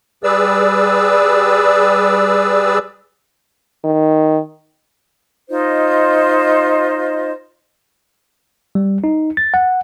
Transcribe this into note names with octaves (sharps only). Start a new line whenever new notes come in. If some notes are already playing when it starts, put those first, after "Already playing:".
G3 G#4 B4 D5 E6
D#3
D#4 F4 C5 D#5
G3
D#4
A6
F#5